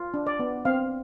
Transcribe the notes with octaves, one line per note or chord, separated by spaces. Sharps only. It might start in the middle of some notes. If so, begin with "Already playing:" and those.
Already playing: F4
D4
D5
B3
C4 F5